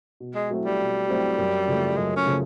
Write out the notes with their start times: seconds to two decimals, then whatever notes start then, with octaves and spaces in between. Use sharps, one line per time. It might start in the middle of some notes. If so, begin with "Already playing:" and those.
0.20 B2
0.35 G#3
0.51 F#3 A3 C4 E4
0.65 G3
0.79 B2
1.09 F#3 A3 C4 E4
1.38 F#2
1.68 C#3 F3 A3
1.97 F#2 G#3
2.16 C#4
2.26 C#3 F3 A3